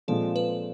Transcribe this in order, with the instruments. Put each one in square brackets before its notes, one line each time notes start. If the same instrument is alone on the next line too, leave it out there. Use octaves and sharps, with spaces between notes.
[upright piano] A#2 F3 G#3 C4 [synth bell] A4
[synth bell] B4